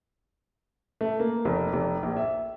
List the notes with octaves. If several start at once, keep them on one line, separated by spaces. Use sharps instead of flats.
A3
A#3
F1
F1
A#1
E5